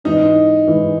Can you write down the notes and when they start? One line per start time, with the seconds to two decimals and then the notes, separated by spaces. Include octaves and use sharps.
0.04 G#2 E3 G#3 D#4
0.67 G#2 E3 G#3